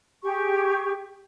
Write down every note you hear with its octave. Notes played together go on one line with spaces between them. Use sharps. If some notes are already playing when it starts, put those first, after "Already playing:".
G4 G#4 C#6